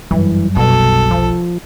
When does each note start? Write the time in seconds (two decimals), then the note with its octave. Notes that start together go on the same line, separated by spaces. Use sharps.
0.11 G1 F#2 E3 F#3 G3
0.56 F1 B1 B2 A4
1.11 F3